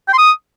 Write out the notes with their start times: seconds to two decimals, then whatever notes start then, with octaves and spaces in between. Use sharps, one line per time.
0.08 G5
0.13 C6
0.18 D#6